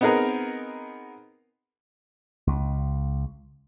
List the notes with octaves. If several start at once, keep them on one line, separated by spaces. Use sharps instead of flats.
B3 C4 D#4 G#4 A#4 A#5
C#2